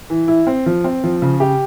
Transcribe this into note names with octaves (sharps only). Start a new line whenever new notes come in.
E3
E4
C4
F3
C4
F3
C#3
G4